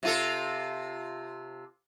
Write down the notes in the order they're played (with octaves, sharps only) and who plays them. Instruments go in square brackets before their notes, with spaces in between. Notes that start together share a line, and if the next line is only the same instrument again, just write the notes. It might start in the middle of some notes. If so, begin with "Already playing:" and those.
[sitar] C3 F4 A4